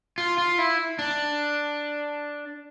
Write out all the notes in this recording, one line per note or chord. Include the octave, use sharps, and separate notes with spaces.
F4
F4
E4
D4